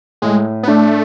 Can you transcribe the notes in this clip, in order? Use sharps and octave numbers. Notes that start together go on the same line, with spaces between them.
A2 G#3
B3
A3 D4